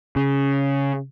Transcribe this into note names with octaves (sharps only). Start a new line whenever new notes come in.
C#3